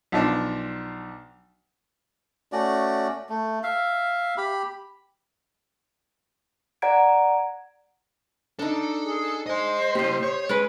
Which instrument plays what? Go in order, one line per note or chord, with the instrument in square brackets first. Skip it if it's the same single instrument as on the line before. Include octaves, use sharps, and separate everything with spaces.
[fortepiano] B1 F3 D4
[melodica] A3 C#4 F#4 D5
A3
E5 F5
G4 B5
[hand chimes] D5 F#5 A#5 G#6 D7
[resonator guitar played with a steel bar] D4 D#4 [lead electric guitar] A4
[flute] G#4
[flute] C5 [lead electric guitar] D#5 G#5
[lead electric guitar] A#3 E4 [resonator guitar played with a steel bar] G4 D#5
[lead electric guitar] C#5
[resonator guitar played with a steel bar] G#3 B4